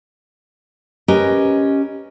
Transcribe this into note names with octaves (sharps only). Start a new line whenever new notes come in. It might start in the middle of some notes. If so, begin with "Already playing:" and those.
C#4 G4 A#4 B4 D#5